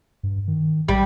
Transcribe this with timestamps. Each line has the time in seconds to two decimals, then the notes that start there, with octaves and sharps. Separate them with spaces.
0.23 G2
0.48 D#3
0.88 A#1 G3